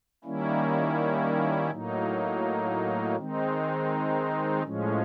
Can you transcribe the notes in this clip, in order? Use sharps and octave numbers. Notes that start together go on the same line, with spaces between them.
D#3 G3 A#3 C#4 E4
A2 F#3 A#3 D#4
D#3 G#3 C4 D#4
A2 F3 G#3 C#4